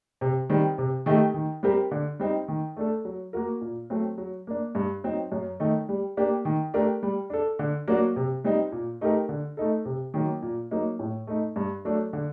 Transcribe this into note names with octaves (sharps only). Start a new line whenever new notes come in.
C3
D#3 G3 C4
C3
D#3 A3 D#4 G4
D#3
G3 C4 G4 A#4
D3
G3 C4 D#4
D#3
A3 D4 A4
F#3
A#3 F#4 A#4
A#2
F#3 A3 C4
F#3
A#3 D4
G2
F#3 C4 D#4
F#2
D#3 A3 D#4
G3
A#3 D4 G4
D#3
A3 D4 G4 A#4
G3
D4 A4
D3
F#3 A#3 D4 F#4
C3
G3 C4 D#4
A#2
A3 D#4 G4 A#4
D3
A3 D#4 A4
C3
D#3 F#3 A#3
A#2
F#3 A#3 D#4
A2
A3 D#4
G2
F#3 A3 D4 A4
D3